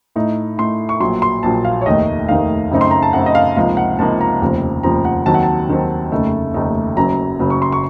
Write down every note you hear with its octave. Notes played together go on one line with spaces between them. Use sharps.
A2 A3 D#4
A2 A3 D#4 C6
C#6
A#1 A#2 F#3 C6
C6
A#1 A#2 F#3 A5
F5
C#5
F1 D#2 D#3 A3 D#4 D#5
F1 D#2 D#3 A3 D#4 F5
F#2 C#3 A3 C4 D#4
C6
A#5
A5
F#2 C#3 A3 C4 D#4 F#5
D#5
F5
C#2 C3 F3 A#3 D#4 F5
F#5
C#2 C3 F3 A#3 D#4 A5
A#5
F1 D#2 C#3 F3 C4
F1 D#2 C#3 F3 C4 A#5
F#5
D#2 D#3 F#3 C4 A5
F#5
A5
D#2 D#3 F#3 C4
F1 D#2 C#3 A3 D#4
F1 D#2 C#3 A3 D#4
F#1 F#2 C#3 F#3 A#5
F#1 F#2 C#3 F#3
C#6
C6
C#6